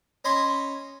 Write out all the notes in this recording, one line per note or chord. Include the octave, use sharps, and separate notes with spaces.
C#4 D#5 G#5 B5 C6